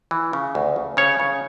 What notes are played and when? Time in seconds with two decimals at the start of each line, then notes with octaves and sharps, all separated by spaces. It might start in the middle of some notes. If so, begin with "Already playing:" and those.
0.11 E3
0.33 C#3
0.55 D2
0.76 C#3
0.97 C#3 C#5
1.20 C#3